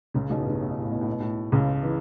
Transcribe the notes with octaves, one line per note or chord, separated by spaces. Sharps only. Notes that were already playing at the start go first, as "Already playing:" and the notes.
C#2 C#3
B1 B2
A2
G2
A2
B2
A2
B2
A2
B2
A2
C#2 C#3
E3